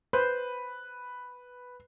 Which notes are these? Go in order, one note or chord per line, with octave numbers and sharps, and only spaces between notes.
B4 C5